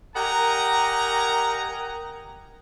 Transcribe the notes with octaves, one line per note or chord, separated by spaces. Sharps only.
G4 A#4 D#5 F#5 G#5 A#5